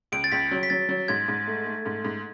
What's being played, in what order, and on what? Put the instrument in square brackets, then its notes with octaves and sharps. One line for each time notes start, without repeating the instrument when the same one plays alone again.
[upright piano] C#2 [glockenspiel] D7
[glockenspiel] A6
[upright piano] C#2 [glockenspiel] B6
[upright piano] F#3
[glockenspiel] B6
[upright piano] F#3 [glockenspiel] A6
[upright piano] F#3
[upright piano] G#2 [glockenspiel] G#6
[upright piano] G#2
A3
A3
G#2
G#2